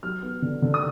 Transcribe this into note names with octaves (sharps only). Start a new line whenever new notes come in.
F#3 F6
B3
D3
D3
D#6